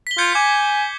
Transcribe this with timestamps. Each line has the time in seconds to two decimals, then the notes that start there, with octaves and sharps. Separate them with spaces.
0.07 B6 G7
0.18 F4 G6 G#6 C#7
0.35 G#5 D6